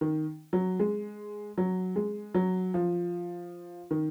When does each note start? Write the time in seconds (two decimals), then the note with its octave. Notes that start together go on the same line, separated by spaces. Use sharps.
0.01 D#3
0.53 F#3
0.80 G#3
1.58 F#3
1.96 G#3
2.34 F#3
2.74 F3
3.91 D#3